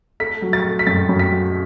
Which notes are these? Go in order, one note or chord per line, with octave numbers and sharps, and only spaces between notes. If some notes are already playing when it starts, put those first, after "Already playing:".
A3 B6
F#3
A6
A3
B6
F#2 A6
F#2
B6
F#3